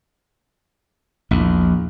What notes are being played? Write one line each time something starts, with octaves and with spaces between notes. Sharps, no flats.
A#1 E2